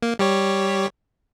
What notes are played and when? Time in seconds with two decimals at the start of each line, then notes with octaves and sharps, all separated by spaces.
0.03 A#3
0.19 G3 G4 C#5